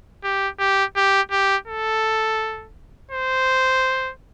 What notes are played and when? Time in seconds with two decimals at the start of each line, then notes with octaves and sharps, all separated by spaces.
0.24 G4
0.59 G4
0.96 G4
1.32 G4
1.67 A4
3.11 C5